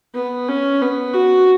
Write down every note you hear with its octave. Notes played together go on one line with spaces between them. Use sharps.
B3
C#4
B3
F#4